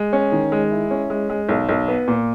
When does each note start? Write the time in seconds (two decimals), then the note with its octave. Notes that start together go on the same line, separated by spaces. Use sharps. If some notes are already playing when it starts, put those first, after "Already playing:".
Already playing: G#3
0.13 C#4
0.32 D#3
0.52 G#3
0.71 E4
0.91 C#4
1.10 G#3
1.30 G#3
1.49 B1
1.69 B1
1.88 B3
2.08 A#2